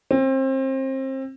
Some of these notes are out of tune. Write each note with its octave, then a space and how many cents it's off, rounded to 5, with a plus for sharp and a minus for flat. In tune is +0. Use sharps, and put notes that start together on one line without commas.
C4 +30